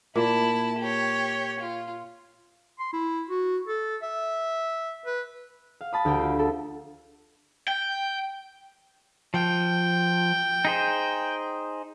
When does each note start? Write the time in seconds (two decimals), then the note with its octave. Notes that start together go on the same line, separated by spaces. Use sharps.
0.16 A#2 E4 A5
0.79 G4 C#5
1.59 F4
2.79 C6
2.93 E4
3.29 F#4
3.67 A4
4.02 E5
5.06 B4
5.81 F5
5.93 A5 B5 D#6
6.05 D2 G4 G5 D7
6.18 F4
6.39 A4
7.68 G5
9.34 F3 G5
10.65 D#4 G#4 C5